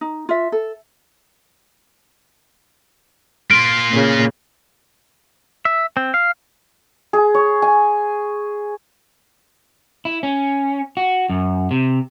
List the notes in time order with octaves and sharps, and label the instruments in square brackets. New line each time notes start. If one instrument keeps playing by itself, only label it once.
[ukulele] D#4
F4 E5
A4
[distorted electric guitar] A#3 F4 [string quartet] C6 [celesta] D7
[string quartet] A#2 C#3
[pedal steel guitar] E5
C4
F5
[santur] G#4
C#5
G#5
[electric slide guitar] E4
C#4
F#4
F#2
C3